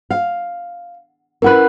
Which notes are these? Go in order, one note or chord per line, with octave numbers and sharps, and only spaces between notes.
F5
C#4 E4 A#4 B4 F#5 F#6